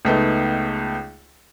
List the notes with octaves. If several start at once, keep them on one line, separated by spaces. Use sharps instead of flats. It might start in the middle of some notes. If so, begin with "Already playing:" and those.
C#2 A3 B3 D#4